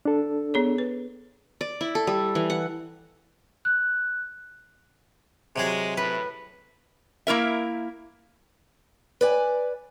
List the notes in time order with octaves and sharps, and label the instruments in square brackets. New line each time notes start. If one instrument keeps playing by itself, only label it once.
[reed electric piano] D4 A4
[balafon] B3 G#4 C#5
B4
[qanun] D5
E4
A4
G3
E3
F#5
[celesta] F#6
[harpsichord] C3 F#3 G#4 [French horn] G#3
[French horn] A2 [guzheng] B4
[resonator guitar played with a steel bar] A#3 E4 A#4 E5
[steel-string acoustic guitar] B4 D5 G#5